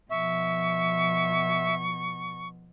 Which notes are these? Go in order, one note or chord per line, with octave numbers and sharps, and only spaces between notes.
B2 F3 E5 C#6